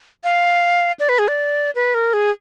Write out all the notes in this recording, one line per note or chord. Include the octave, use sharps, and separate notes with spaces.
F5
D5
B4
G#4
D5
B4
A#4
G#4